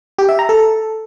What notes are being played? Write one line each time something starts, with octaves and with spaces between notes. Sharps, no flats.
G4
E5
A#5
A4